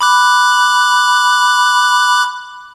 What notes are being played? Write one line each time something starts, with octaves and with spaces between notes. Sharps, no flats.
B5 D6 F#6